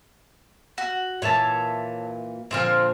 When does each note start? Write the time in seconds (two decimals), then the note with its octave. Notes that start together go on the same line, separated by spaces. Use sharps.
0.78 F#4
1.22 A#2 E3 C#5 E5 A5
2.51 A#2 D3 F3 C4 F4 F6